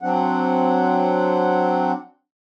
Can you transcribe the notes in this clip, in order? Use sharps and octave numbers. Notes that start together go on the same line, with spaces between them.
F#3 C4 D4 F#5